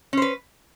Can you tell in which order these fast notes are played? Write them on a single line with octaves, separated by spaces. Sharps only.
C#4 C5 B4